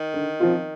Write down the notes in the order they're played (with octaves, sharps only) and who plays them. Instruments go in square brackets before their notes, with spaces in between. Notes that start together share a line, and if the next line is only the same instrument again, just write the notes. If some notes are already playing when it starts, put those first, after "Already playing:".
Already playing: [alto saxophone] D#3
[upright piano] D3
F3 C4 F4